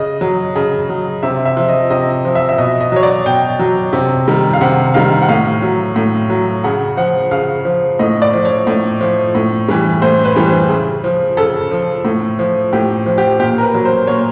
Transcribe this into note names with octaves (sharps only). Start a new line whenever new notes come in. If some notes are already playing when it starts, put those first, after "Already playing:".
Already playing: C#3 D#5
F#3
C#3
F#3
C3 E5
E5
F3
D#5
C3 D#5
F3
E5
E5
B2 D#5
D#5
F#3 C#5
D5
B2 G5
F#3
C3
D#3 G3
F5
C3 F#5
D#3 G3 F5
F#5
A2 F5
F#3
A2
F#3
C#3 F#5
F3 F#5
C#3 F5
F3
A2 D#5
D5
F3
C#5
A2
F3
A2
E3 G3
A2 C5
B4
E3 G3
C5
C#3
F3
C#3 A4
F3
A2
F3
A2 G4
F3
G4
A#2 G4
A#4
B4
F#3
C5
A#2 C#5